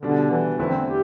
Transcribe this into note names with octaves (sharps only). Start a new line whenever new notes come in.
B2 D3 G3 D4
E3
E2 D3 F3 A3 E4 B4
C4
G4